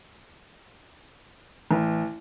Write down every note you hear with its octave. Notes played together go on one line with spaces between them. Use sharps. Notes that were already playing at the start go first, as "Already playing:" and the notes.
A1